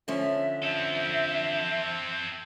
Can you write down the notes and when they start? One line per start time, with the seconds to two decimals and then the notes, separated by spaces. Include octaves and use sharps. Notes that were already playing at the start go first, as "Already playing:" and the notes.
0.08 D3 F3 C#4 E5
0.63 C4 A4 E5